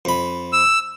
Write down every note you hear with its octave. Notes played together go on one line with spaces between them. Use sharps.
F2 B5
E6